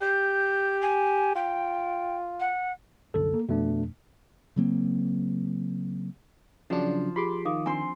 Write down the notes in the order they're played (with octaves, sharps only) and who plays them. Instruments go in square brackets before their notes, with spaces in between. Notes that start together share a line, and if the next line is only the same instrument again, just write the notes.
[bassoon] G4 [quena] G6
[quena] G#5
[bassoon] F4 [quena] G5
[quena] F#5
[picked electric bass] C2 F#2 D3 [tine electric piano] A4
[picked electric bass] A#3
[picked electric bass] F2 [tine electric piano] B2 A3 D4
[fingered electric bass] C#3 F#3 A#3 C4
[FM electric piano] C#3 F#3 D4 [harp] F3
[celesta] F4 G4 G#4 [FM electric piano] B5 C6 D6
[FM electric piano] D#3 [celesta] F5 D6 D#6
[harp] C4 C6 [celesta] D4 F4 G#5